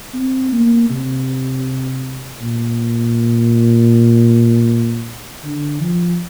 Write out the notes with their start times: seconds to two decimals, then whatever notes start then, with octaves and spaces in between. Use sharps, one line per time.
0.14 C4
0.52 A#3
0.90 C3
2.41 A#2
5.44 D3
5.81 F3